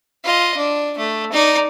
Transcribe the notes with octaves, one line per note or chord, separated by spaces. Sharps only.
F4 D#5
D4
A3
D#4 D5